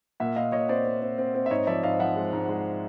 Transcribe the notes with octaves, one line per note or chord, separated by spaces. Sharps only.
A#2 E5 F#5
A#2 D#5 F5
A#2 C#5 D#5
C4 C5 D5
C4
C4
C4
C4
E5
G#2 C#5 D#5
F3 D5 E5
G#2 D#5 F5
F3 E5 F#5
G#3
G#2
G#3